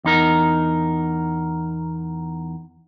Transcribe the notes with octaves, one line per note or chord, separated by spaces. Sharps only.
E2 D#4 A#4